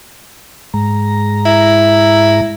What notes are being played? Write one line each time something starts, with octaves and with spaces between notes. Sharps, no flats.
G#2 G#3 A#5
E4